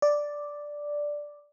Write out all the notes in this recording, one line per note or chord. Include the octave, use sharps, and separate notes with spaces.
D5